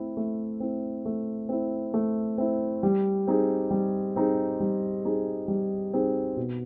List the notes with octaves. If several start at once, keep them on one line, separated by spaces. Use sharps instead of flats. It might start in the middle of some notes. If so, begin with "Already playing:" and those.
Already playing: A3 C4 E4
A3
C4 E4
A3
C4 E4
A3
C4 E4
G3
C4 D#4 G#4
G3
C4 D#4 G#4
G3
C4 D#4 G#4
G3
C4 D#4 G#4
B2